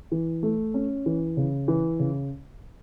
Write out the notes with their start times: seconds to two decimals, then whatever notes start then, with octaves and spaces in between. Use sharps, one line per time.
0.12 E3
0.43 A3
0.74 C#4
1.06 E3
1.37 C#3
1.68 E3
1.99 C#3